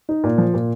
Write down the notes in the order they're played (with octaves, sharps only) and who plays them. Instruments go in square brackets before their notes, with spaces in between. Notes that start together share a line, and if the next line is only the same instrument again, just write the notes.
[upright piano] D#4
A#2
F3
A#2